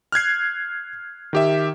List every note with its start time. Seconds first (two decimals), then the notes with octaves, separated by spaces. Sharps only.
0.12 F6 F#6 G#6 C7
1.33 D#3 G4 E5